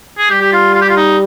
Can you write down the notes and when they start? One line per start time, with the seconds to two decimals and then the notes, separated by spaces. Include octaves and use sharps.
0.18 G#4
0.30 G3 G4
0.41 G4
0.52 F4
0.74 F4
0.82 G4
0.89 F4
0.97 D#4